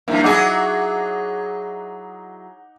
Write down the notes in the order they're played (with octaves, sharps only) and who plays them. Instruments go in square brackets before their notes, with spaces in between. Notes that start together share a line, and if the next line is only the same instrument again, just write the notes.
[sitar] G2 F3 [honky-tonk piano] A#3 E4
[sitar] F#3 E4 G#4 [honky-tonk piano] D#4 F#5 D6